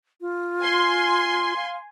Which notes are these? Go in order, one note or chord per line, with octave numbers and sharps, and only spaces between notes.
F4
G#5 C6
F5